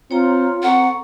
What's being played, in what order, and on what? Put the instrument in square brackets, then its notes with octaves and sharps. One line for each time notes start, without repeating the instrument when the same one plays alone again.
[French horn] C4 [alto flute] F4 [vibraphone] C#5 G5 A#5
[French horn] C4 [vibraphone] A4 A#5 C#6 [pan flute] F#5